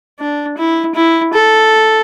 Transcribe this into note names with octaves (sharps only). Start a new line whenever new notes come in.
D4
E4
E4
A4